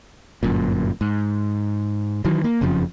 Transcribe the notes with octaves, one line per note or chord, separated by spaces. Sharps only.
G1 F#2 A#2
G#2
D#3 E3 F#3
A#3
F#1 F2 C#3 F3